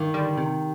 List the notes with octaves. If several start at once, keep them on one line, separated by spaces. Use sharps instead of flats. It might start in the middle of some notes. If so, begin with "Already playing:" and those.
Already playing: G2 D#3
D3 G3
C3